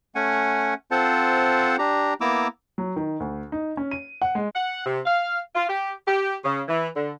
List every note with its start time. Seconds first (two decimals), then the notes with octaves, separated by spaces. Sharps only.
0.15 A3 C#4 F#5 G#5
0.91 C4 F4 A4 C5 F#5 A5
1.79 D4 G4 A#5
2.21 A#3 B3 E4 A#5 D6 E6
2.78 F#3
2.96 D#3
3.20 D2
3.52 D#4
3.77 C#4
3.91 D#7
4.22 F#5
4.35 G#3
4.55 F#5
4.85 C3
5.06 F5
5.56 F4
5.69 G4
6.07 G4
6.45 C#3
6.68 E3
6.96 D3